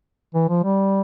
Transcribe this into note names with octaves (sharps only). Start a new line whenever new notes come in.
E3
F3
G3